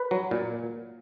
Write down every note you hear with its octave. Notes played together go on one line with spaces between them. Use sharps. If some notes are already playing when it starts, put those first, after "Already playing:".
Already playing: B4
F#3
A#2